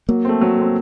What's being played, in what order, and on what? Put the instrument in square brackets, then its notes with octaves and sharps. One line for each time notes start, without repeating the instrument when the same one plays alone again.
[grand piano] F#3 [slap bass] A#3
[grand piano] A3 C4
F#3
A3 C4